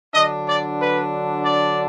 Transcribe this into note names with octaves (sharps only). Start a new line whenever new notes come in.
D3 F#3 D4 D#5
D5
B4
D5